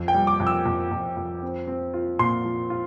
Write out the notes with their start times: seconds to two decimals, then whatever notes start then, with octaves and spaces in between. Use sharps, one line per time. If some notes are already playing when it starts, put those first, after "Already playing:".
Already playing: F2
0.08 G5
0.14 G3
0.27 D6
0.40 F2
0.47 E6
0.65 F2
0.91 F2
1.17 F2
1.43 C4
1.67 C4
1.94 F4
2.19 A#2 C6
2.45 F3
2.70 F4